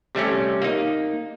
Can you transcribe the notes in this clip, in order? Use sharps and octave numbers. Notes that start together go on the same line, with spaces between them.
C3 G3 A3 C#4
A#3 D#4